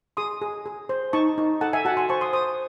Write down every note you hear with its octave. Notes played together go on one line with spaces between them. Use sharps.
G#4 C6 D#6
G#4
G#4
C5
D#4 A5 C#6
D#4
A4 F#5 A5
E5 G#5
F#4 F#5 A5
G#5 C6
C5 A5 C#6
C6 D#6
C5 C6 D#6